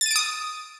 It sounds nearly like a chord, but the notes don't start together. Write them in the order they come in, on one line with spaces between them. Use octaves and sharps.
A6 D#7 D7 D#6